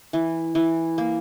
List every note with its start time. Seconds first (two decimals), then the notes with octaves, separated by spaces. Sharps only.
0.13 E3
0.55 E3
0.98 A#3